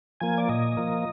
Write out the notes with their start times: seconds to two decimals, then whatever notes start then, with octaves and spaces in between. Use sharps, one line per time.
0.20 F3 A#3 G#5
0.38 D5
0.49 A#2 D#5
0.77 F3 A#3